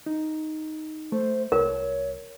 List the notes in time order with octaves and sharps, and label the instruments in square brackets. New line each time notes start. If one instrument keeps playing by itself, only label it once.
[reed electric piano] D#4
[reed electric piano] A3 [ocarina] C5
[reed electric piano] C2 [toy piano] A#4 [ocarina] C#5